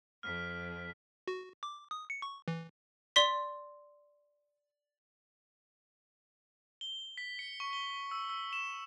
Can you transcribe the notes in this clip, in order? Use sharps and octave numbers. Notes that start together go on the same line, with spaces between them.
F2 F6 B6
F#4
D6
D#6
C#7
C#6
E3
D5 C6 B6
G7
B6
C#7
C#6
G7
E6
E6
E7